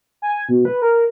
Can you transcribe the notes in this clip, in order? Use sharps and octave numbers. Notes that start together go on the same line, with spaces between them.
G#5
B2
B4
A#4